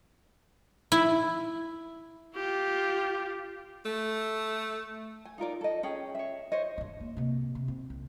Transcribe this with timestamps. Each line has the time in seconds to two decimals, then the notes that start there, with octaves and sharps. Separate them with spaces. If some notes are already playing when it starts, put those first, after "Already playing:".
0.92 E4
2.35 F4 G4
3.85 A3
5.25 G#5
5.38 D#4 F4 A#4 D5
5.61 A4 D#5
5.83 C#4 G#4 G5
6.15 C#5 E5
6.52 C5 C#5 D#5
6.78 G2 D4
7.00 A#3
7.17 C3 A#3
7.55 C3
7.68 C4
7.90 C2